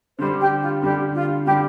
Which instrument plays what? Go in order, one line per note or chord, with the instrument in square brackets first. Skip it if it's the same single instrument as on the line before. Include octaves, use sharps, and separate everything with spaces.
[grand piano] D3 [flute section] C5
[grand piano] G3 D4
[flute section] G4
F4
[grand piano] D3 G3 D4 [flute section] G4
[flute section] F4
[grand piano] D3 G3 D4 [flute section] G4